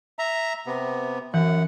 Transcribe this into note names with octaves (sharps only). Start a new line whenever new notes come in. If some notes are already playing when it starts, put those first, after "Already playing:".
E5 A#5
C3 B3
F#2 E3 F#5